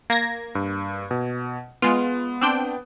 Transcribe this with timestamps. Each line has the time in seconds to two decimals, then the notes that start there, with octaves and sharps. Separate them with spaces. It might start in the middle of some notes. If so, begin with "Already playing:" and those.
0.10 A#3 G#6 A#6
0.55 G2
1.11 B2
1.82 G#3 B3 F4
2.41 C4 D4 G5